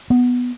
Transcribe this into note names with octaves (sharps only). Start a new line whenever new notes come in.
B3